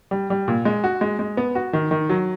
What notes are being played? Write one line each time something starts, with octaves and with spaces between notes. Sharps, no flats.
G3
G3
A#2
G#3
F#4
G#3
G#3
B3
F#4
D#3
D#3
F#3